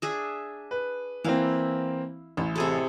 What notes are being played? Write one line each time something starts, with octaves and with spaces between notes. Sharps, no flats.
D4 G#4 E5
B4
E3 A#3 C4 E4 F5
A1 E4
C3 G#4 A4